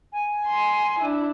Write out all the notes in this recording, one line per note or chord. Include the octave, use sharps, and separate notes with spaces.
G#5
C6
D4 E4